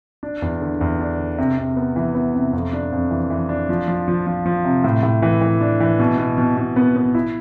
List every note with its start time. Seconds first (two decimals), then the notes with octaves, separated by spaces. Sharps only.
0.23 D4
0.42 E2
0.62 D3
0.81 E2
0.99 D4
1.19 D3
1.38 C3
1.58 C3
1.77 B3
1.96 E3
2.15 B3
2.34 C3
2.53 F2
2.73 D4
2.92 F2
3.11 E3
3.30 E3
3.49 D4
3.69 F3
3.88 F3
4.08 F3
4.27 F3
4.46 F3
4.64 C3
4.84 A2
5.03 A2
5.22 E3
5.41 E3
5.61 D4
5.80 E3
5.99 B2
6.18 B2
6.38 B2
6.57 B2
6.76 B3
6.96 B3
7.15 E4